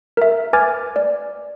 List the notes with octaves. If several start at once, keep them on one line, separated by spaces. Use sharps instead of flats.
A#4 E5
B4 G#5 D6 F6 G#6 A6
D5